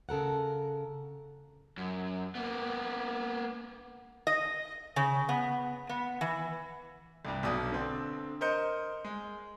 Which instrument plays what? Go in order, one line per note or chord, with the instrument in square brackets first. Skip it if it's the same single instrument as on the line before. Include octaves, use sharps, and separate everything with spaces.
[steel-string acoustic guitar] C#3 A4 A#4 F#5
[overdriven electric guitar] F#2
A#3 B3
[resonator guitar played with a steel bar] D#5
C#3
B3
B3
E3
[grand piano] C2 G2
B1 B2 D4 D#6
D3 C4
A#4 C5 D#5 G6 C#7
G#3